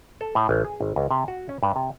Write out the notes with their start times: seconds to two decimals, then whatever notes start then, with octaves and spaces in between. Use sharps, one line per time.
0.21 A4
0.35 A2
0.49 A1
0.65 G#4
0.81 G#1
0.96 C#2
1.11 C3
1.28 F#4
1.49 C#4
1.63 G2
1.76 C3